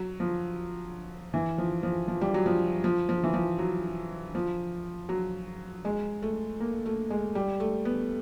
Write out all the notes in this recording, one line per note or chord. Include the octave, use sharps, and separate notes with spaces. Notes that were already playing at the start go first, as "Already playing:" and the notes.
Already playing: F#3
F3
E3
F3
F3
F3
G3
F#3
F3
F3
F3
E3
F3
F#3
F3
F#3
G#3
A3
A#3
A3
G#3
G3
A3
B3